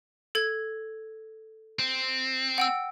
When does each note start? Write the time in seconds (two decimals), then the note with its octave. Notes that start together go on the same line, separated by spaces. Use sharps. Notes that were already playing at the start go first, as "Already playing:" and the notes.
0.35 A4 G#6
1.79 C4
2.58 F#5 G5 E6